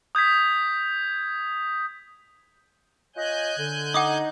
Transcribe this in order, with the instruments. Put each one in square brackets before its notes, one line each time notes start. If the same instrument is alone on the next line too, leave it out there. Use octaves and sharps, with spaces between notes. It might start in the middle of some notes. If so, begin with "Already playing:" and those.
[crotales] D#6 G6 G#6 B6
[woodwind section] F4 C#5 D#5 [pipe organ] G#5 F#6 G6
[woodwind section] D3
[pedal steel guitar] D#4 [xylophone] F#5 D6 D#6